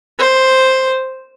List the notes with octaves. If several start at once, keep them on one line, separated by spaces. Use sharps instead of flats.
C5